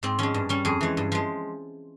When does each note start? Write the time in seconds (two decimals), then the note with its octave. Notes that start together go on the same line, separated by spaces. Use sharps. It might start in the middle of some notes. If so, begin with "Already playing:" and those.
0.03 G#2 C4
0.19 F3 G#3 C#4
0.34 G2
0.49 G3 C#4
0.65 F2 G#4
0.81 E3 G#3
0.97 G2
1.12 F3 G#3